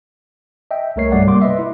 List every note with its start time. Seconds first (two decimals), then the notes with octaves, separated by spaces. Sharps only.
0.71 D#5 E5 G5
0.96 C2 A3 A#4 C#5 C7
1.12 G2 F#3 G3 A3 D5 F#5
1.26 C3 G3 A#3 C6 D6
1.42 B4 D#5 E5
1.59 E4